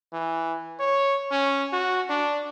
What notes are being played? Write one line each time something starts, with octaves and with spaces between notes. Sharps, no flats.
E3
C#5
C#4
F#4
D4